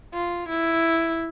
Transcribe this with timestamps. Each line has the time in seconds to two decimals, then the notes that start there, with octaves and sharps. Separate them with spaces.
0.14 F4
0.49 E4